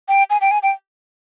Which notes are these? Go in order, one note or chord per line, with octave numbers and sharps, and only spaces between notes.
G5
G#5
G5
G#5
G5